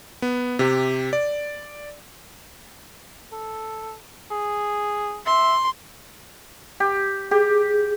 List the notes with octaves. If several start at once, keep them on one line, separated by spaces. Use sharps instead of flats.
B3
C3 G4
D5
A4
G#4
E5 C6
G4
G4 G#4